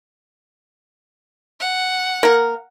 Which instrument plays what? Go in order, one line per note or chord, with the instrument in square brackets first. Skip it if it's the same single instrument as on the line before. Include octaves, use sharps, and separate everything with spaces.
[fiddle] F#5
[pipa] A#3 A#4